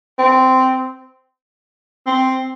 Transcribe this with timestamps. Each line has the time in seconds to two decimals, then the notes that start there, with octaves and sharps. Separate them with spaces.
0.19 C4
2.06 C4